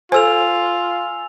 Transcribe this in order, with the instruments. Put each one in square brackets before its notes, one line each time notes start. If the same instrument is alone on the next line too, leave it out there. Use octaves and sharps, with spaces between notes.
[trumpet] F4 [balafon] A4 C5 [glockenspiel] G#5 E6 F7